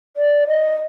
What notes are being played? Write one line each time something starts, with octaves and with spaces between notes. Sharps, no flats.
D5
D#5